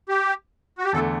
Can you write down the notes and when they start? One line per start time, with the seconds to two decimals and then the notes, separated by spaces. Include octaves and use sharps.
0.09 G4
0.78 F#4
0.85 G4
0.93 E2 D3 A3 A4